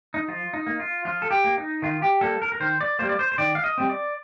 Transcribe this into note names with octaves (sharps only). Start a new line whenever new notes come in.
D#4
F3 F4
D#4
A#3
F4
F3 F4
A4
G4
A#3
D#4
D#3 F4
G4
G3 A#3 A4
A#4
A#4
D#3 C5
D5
G3 A#3 C5
D5
C5
C5
D#3 D5
F5
D#5
G3 C4
D5